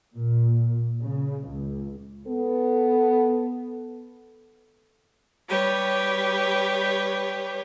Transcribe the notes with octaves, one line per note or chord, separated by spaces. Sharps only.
A#2
C#3
C#2
B3 A4
G3 G4 B4 C#5